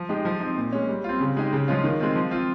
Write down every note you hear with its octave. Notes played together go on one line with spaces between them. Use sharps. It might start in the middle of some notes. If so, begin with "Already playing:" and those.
Already playing: F3
G#3 D#4 G4
F3
C4 D#4
A#2
G#3 C#4
G3
C4 F4
C#3
G#3 D#4 G4
C#3
F3 G#3 C#4 F4
D#3
G#3 C4 F4
F3
C4 F4